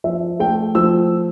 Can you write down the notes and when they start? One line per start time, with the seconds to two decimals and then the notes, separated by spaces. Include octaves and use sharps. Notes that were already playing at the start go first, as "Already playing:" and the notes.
0.04 F3 E5
0.40 A3 G5
0.75 F3 E6